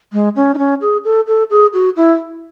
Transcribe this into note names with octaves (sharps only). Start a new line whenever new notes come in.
G#3
C#4
D#4
C#4
G#4
A4
A4
G#4
F#4
E4